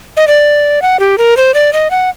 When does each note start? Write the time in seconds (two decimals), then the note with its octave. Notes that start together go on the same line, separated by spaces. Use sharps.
0.17 D#5
0.27 D5
0.82 F#5
1.00 G4
1.18 A#4
1.37 C5
1.54 D5
1.73 D#5
1.91 F#5